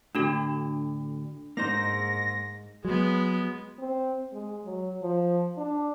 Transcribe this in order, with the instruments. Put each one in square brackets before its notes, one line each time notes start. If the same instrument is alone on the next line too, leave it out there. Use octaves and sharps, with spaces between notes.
[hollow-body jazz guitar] A2 D3 [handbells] D4 F#4 A4
[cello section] G#2 [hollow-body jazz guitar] A#3 D#4 C5 [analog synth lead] A#6
[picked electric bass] F#3 [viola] G#3 B3
[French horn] C4
G#3
F#3
F3
D4